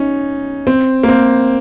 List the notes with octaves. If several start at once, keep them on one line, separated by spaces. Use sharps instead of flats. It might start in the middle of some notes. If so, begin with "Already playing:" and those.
Already playing: C#4 D#4
C4
A#3
C4